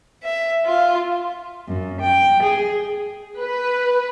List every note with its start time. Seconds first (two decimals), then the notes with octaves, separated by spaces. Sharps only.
0.24 E5
0.66 F4
1.68 F#2
2.01 G5
2.43 G#4
3.40 B4